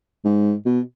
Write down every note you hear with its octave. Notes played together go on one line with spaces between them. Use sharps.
G#2
B2